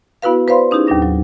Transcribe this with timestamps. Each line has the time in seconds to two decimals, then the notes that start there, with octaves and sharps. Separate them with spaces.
0.22 B3 E4 F#4 B4 F5
0.48 B4 C5 D5 F5 B5 C6
0.71 C#4 D#4 E4 G4 G#4
0.87 D#2 A2 F#3 D4 A#6
1.02 F#3